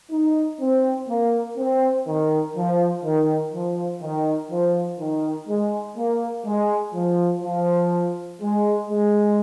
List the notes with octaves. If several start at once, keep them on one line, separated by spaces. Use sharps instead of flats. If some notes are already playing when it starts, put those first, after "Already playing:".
D#4
C4
A#3
C4
D#3
F3
D#3
F3
D#3
F3
D#3
G#3
A#3
G#3
F3
F3
G#3
G#3